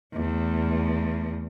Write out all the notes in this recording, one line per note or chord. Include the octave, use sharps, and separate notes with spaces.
E2 A3